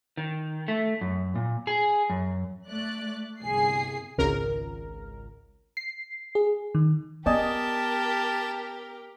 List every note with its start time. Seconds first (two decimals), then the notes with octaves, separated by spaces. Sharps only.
0.17 D#3
0.68 A3
1.01 F#2
1.36 A#2
1.67 G#4
2.10 F#2
2.68 A3 D5 F#6
3.41 G1 C2 G#4 C7
4.18 G#1 C#2 A#4
5.77 C7
6.35 G#4
6.75 D#3
7.26 B3 G4 A#4 D5 D#5 G#5 A5